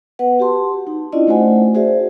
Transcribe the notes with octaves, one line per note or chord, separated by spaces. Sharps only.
B3 B4 F#5
F#4 G4 A5 C6
D#4
C#4 D4 E4 F4 D5 D#5
A3 D#4 F#4 C5 F#5 G#5
F#4 G#4 C5 D5 E5